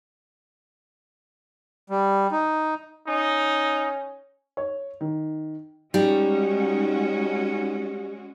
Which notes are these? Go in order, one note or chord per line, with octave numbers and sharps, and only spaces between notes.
G3
D#4
C#4 D#4
C#5
D#3
G3 G#3 C#4 D#4 F#4